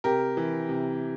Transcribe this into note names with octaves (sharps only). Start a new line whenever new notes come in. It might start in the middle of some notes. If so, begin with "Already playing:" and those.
C3 G4 A#4
E3
C3